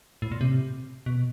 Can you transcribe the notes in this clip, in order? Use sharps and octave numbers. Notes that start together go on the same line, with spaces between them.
A2
A#2
C3
B2